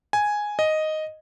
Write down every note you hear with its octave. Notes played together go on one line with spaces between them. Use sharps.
G#5
D#5